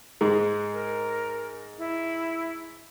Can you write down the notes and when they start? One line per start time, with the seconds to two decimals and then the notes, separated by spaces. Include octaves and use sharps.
0.21 G#2 G#3
0.72 A#4
1.78 E4